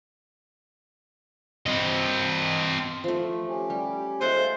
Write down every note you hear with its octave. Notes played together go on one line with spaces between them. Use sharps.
C4 D#5
F3 A3
C#4 G4
G3
G#3 A3 F4 A4 C5 F#5 G#5